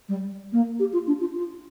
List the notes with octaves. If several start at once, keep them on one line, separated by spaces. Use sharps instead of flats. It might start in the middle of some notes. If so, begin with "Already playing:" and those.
G3
A#3
G4
F4
D4
F4
F4